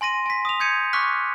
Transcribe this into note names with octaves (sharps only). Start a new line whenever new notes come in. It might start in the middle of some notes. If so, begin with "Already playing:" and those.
G#5 C6 A#6 D#7
G#5 B6
D#6 F7
D#6 G6 G#6 C#7 D#7
C#6 D6 F6 F#6 B6